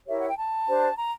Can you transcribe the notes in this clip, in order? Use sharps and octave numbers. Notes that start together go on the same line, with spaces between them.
E4 G4 A#4 C#5 E5
F#5
G5
A5
D4 G4 C5
A#5